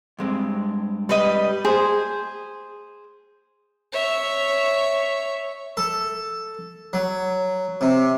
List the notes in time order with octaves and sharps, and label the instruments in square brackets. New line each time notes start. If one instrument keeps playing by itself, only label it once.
[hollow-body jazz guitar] G2 G#3 C4
[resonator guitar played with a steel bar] G3 B4 D#5
[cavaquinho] G#4 C5
[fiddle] C#5 E5
[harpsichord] A4
F#3
C3